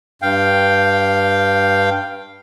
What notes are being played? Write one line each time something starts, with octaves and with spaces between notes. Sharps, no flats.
G2 F5 G5